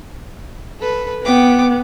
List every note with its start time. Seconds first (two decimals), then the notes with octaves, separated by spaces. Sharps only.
0.79 A4 B4
1.24 B3 G5 D6